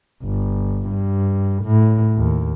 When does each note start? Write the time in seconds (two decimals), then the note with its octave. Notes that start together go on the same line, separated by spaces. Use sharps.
0.24 G1
0.89 G2
1.64 A2
2.17 D#2